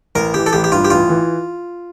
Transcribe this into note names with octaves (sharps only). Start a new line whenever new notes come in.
A1 A#4
E3 G4
A4
A1 G4
G4
G2 F4
G4
A1 F4
E3